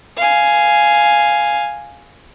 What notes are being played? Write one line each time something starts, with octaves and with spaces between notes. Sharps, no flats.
F5 G#5